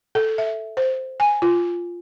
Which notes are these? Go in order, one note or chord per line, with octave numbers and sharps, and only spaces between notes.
A4
E5
C5
G#5
F4